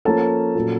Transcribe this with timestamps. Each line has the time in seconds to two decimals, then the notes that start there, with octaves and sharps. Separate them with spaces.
0.05 F3 A#3 C#4 A4 A5
0.55 A#2 F#3 A#3 C#4